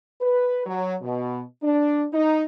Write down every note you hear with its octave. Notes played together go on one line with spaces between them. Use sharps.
B4
F#3
B2
D4
D#4